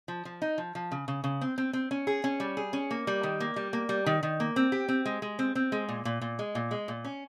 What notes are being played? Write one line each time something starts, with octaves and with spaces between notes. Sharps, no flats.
F3
F3
D#4
F3
F3
C#3
C#3
C#3
C4
C4
C4
C#4
G#4
C#4
G3
G#4
C#4
A#3
G3
D#3
A#3
G3
A#3
G3
D#3
D#3
A#3
C4
G4
C4
G#3
G#3
C4
C4
G#3
A#2
A#2
A#2
G#3
A#2
G#3
A#2
C#4